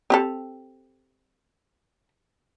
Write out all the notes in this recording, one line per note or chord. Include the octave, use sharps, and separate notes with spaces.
C4 G4 A4